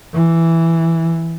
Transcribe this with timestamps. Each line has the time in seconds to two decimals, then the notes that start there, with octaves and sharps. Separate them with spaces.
0.15 E3